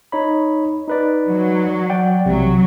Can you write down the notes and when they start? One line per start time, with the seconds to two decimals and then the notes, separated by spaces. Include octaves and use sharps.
0.12 D#4 C#5 B5
0.88 D#4 B4 D5
1.28 F#3
1.90 D5 F#5 G5
2.26 B1 C3 F#3